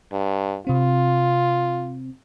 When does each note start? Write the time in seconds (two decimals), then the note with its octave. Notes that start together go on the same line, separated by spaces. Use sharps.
0.12 G2
0.67 C3 C4 F4